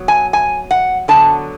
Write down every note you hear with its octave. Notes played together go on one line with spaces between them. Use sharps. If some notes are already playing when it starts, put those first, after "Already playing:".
Already playing: F#3 B3
G#5
G#5
F#5
D3 F#3 B3 A5